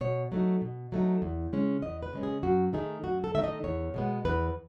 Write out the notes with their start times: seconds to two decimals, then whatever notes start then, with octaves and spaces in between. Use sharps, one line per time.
0.01 B2 C#5
0.32 F#3 A3 D#4
0.62 B2
0.92 F#3 A3 D#4
1.22 E2
1.53 C#3 G#3 C#4
1.82 E2 D#5
2.03 B4
2.13 C#3 G#3 C#4
2.23 G#4
2.43 F#2 F#4
2.73 D#3 A3 D#4 G#4
3.04 F#2 F#4
3.24 A4
3.34 D#3 A3 D#4 E5
3.44 D#5
3.64 E2 C#5
3.94 B2 G#3 B3
4.25 E2 B4